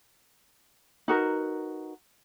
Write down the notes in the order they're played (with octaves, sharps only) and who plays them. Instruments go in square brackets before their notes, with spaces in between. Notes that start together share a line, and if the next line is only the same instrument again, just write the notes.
[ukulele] D#4 F#4 A#4 B4